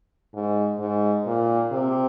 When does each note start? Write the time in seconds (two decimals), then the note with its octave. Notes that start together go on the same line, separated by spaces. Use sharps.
0.35 G#2
0.80 G#2
1.27 A#2
1.72 C3